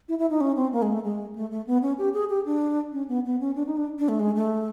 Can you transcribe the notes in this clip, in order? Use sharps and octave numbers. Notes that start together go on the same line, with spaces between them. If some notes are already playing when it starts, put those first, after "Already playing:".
E4
E4
D#4
C#4
C4
A#3
G#3
A3
G#3
A3
A3
B3
C#4
G4
G#4
G4
D4
C#4
B3
B3
C#4
D4
D#4
D4
D4
A3
G#3
A3